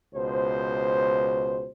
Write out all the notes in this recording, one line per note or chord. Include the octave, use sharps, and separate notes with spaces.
C#2 B2 C5